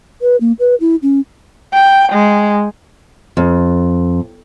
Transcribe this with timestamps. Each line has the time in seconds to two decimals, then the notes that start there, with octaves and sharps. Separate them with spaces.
0.22 B4
0.41 A#3
0.60 B4
0.81 E4
1.02 C#4
1.74 G5
2.12 G#3
3.37 F2